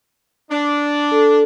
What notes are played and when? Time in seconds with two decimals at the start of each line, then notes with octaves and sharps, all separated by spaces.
0.52 D4
1.11 A4